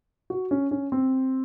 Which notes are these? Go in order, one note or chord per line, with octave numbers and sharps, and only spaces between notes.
F#4
C#4
C#4
C4